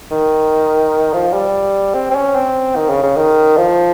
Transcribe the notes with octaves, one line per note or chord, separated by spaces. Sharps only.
D#3
F3
G3
C4
C4
C#4
C4
D#3
C#3
C#3
D#3
F3